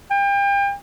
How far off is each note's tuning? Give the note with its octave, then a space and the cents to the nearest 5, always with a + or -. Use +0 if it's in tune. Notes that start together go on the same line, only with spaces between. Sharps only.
G5 +35